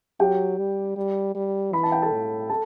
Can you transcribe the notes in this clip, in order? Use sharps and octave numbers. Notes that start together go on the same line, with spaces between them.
F#3 G4 G5
G3
G3
G3
E3 B5
A5
G5
A4 A5
A2
A4 A5